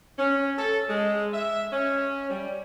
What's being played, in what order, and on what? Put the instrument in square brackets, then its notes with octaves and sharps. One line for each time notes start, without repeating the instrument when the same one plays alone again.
[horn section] C#4
A4
G#3
E5
C#4
G3